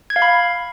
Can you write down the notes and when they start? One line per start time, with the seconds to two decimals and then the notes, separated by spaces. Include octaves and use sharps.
0.10 G#6
0.16 F5
0.22 B5